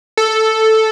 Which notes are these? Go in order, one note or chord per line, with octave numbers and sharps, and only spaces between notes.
A4